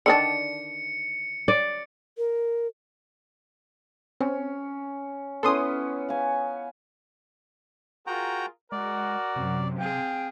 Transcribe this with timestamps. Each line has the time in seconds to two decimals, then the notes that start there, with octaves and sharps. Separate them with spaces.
0.06 D3 D#3 D4 C#7
1.48 D5
2.18 A#4
4.20 C4 C#4
5.43 B3 C#4 E4 A4 C6 D#6
6.09 F5 G#5
8.07 F4 F#4 G#4 A#4 G5 A#5
8.72 G#3 F#4 A#4 D5 F#5
9.36 F#2 C3
9.79 C4 G#4 F5 G5